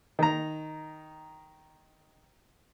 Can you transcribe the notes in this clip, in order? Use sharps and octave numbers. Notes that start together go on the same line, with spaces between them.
D#3 A#5